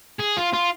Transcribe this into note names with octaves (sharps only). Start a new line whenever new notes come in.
G#4
F4
F4